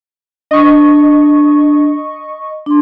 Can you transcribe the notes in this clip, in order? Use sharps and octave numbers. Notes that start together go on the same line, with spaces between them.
D4 D#5 C#6
D4 C6